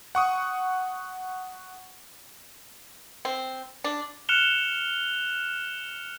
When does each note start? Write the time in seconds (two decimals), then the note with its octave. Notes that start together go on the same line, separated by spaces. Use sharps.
0.15 F#5 C#6 D#6
3.25 C4
3.84 D4
4.29 F6 F#6 C#7 E7 F7 G7